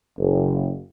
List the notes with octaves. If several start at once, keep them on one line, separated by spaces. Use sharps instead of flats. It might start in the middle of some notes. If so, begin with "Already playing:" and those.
F#1